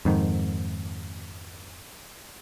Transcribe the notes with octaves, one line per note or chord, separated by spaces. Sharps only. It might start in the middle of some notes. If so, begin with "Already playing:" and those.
F2 G#2 D#3